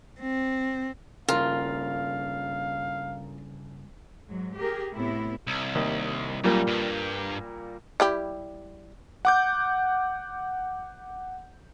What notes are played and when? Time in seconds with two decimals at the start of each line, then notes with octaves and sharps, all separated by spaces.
0.20 C4
1.29 G2 C#3 F4 A#4 F5
4.26 G#2 F#3
4.56 G4 G#4 A#4
4.93 A2 C3 B3 E4
5.47 C2
5.75 D#2
6.44 F#2 A#2 G3 A#3
6.68 G2
8.00 G3 E4 G4
9.25 F#5 D6 G6